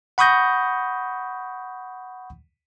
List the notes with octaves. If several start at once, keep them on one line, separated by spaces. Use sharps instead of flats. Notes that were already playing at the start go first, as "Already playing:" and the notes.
F#5 B5 C#6 D#6 G6 A#6